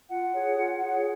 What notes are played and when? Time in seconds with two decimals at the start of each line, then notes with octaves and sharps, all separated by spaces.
0.10 F4 F#5
0.34 G#4 C#5
0.58 F4
0.82 G#4 C#5